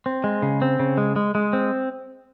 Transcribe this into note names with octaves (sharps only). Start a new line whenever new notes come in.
C4
G#3
C#3
C4
C#3
G#3
G#3
G#3
C4